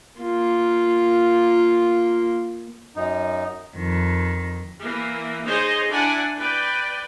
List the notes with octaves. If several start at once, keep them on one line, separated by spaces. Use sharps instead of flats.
A#3 F4
F#2 D#4
F2 D#3
E3 A#3
D#4 G#4 C5 C#5 D#5
D4 E4 D5 F#5 G#5
B4 D5 G5